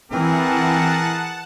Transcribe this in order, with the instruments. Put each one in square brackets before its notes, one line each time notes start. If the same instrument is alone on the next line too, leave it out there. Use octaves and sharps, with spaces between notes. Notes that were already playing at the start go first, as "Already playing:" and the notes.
[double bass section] E3 [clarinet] C4 [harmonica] G#4 A#4 [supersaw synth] F#5 A5